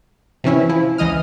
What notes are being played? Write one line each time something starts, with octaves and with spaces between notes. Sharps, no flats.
C3 E3 C#4 E4
F3 E4
C#2 E3 D#5 D#6 F6